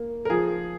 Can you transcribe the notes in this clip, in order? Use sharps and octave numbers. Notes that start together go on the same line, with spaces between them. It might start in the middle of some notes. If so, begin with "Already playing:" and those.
Already playing: A#3
A#4
F3 G#4